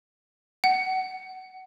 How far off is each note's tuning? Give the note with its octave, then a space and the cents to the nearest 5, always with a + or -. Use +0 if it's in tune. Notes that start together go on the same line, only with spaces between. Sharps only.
F#5 +25